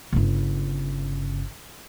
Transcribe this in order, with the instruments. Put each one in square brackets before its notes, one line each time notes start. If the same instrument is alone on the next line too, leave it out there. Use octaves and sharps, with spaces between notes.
[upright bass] G1 C#3